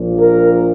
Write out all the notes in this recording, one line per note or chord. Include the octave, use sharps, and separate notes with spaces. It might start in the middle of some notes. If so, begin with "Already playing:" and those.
Already playing: A#1 A#2 F3
A#4